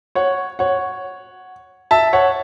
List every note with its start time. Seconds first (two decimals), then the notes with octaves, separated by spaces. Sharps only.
0.15 C#5 F#5
0.59 C#5 F#5
1.91 E5 A5
2.13 C#5 F#5